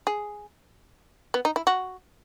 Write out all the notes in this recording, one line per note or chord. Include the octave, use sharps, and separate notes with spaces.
G#4
B3
D#4
E4
F#4